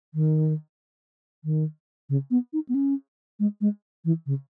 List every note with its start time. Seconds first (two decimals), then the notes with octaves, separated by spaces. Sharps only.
0.14 D#3
1.44 D#3
2.09 C#3
2.31 B3
2.53 D#4
2.69 B3
2.74 C#4
3.40 G#3
3.61 G#3
4.05 E3
4.26 C#3